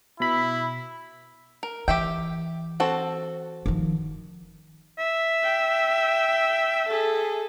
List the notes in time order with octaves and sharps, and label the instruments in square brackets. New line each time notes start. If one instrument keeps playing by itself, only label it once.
[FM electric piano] B2 B5 [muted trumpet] E4
[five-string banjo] A#4
[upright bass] E3 [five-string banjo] G4 E5 G5
[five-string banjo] C4 F#4 A4
[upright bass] D#3 F3
[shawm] E5
[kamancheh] G5
G#4 A4